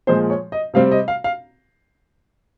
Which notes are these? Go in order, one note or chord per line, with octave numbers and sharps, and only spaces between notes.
A#2 F3 G#3 C5
C#5
D#5
C3 G3 C4 F5
D#5
F5
F5